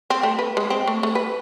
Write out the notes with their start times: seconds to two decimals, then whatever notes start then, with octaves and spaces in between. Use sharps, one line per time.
0.10 C4
0.23 A3
0.39 B4
0.57 G#3
0.70 C4
0.87 A3
1.03 A3
1.15 B4